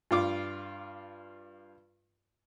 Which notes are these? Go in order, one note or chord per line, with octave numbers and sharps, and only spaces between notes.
G2 F4 D6